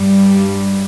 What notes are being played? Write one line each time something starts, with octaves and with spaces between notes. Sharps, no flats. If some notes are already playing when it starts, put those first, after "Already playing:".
Already playing: G2 G3